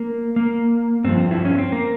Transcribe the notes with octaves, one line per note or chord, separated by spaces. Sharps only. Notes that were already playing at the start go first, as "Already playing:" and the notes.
Already playing: A#3
A#3
G2 F3 C4
E4
C#4
C4
A#3